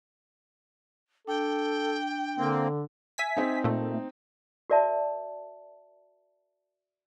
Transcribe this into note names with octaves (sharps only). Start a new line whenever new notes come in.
D4 A4 G5
D3 A#3 C4
E5 G#5 B6
C4 D#4
A#2 A3
F#4 A#4 D5 E5 A5